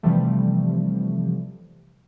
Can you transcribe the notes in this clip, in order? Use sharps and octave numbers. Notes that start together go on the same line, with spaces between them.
C3 E3 F3 G3 A3